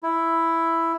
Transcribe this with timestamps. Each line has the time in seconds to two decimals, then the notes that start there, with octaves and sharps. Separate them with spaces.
0.03 E4